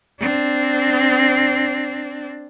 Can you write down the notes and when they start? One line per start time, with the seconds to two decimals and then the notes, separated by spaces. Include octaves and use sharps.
0.20 C4 D4